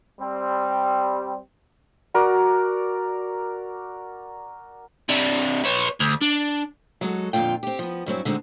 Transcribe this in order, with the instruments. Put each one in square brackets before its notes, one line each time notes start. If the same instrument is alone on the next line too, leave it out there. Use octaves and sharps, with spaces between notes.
[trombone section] G3 C4
[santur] F#4 A#4 D5
[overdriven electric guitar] C3 D4
B4 C#5
D2
D4
[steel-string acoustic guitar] F#3 G#3 F#4 A4
F2 A#2 D3 F4 G5
C4 G4
F3 B3
G2 F#3 C4 C#4
D3 G#3 C4 D#4 F#4